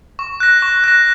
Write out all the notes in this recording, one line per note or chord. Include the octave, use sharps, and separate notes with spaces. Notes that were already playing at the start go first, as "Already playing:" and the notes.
C#6
F#6 A#6
C#6
F#6 A#6